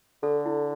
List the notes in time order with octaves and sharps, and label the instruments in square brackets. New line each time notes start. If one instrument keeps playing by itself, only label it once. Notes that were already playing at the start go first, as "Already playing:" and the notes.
[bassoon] D3 [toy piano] A4
[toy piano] E4